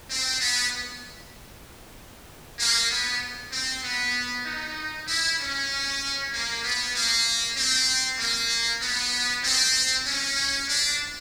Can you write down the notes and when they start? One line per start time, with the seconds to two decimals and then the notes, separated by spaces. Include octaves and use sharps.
0.10 C4
0.41 B3
2.59 A#3
2.90 B3
3.52 C4
3.84 B3
4.46 D#4
5.08 E4
5.40 C#4
6.33 A#3
6.65 B3
6.96 A#3
7.57 C4
8.20 A#3
8.82 B3
9.44 C4
10.06 C#4
10.69 D4